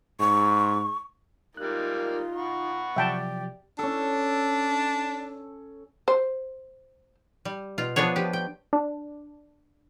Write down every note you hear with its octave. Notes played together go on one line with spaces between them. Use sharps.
G#2 C#6
G3 G#3 A#3 D#4 F4 F#6
F#5 B5 C#6
C3 F3 F#3 G4 D5 E5 G5 A5
C#4 D4 A4
C5
G3
B2 F4
F3 B3 D4 G#4 C#5
F3 G4
G5
D4